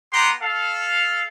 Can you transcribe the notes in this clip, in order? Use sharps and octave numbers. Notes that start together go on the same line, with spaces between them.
B3 G4 F#5 A#5 C6
A4 F5